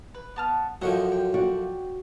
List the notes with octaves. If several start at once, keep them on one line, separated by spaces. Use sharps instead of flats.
B4
B3 A5 F6
F#2 D3 F3 F#4 C#5 D#5 G5 C#6
G5
F#4 D5 F#5